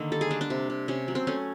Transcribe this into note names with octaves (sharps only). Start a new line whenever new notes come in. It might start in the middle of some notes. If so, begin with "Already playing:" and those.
Already playing: D3 D#3 A#3
G3 A4
G#4
G3 D4
D4
C3
C3
C3 C#4
F#3
C4
A3 C#4